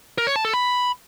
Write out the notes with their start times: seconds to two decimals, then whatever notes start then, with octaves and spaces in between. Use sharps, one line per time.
0.18 A#4
0.27 C#5
0.36 A5
0.45 A4
0.54 B5